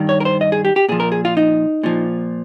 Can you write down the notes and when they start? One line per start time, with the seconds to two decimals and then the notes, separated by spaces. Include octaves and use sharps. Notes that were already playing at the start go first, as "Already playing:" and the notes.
Already playing: G2 D#3
0.09 C#5
0.20 A#4
0.25 C5
0.41 D#5
0.52 G#4
0.65 G4
0.76 G4
0.89 A#2 F3 G#4
1.00 A#4
1.12 G#4
1.25 F4
1.37 D#4
1.83 A#2 F3